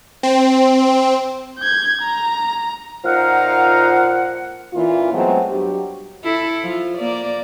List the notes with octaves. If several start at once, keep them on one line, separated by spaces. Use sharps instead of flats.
C4
G6 G#6
A#5
A#2 F3 D#4 A#4 F5 F#5
A#2 E3 C#4 F4
F#3 G#3 A3 B3 C4
G2 F#3 G4
E4 A4
F3 F4
A#3 D5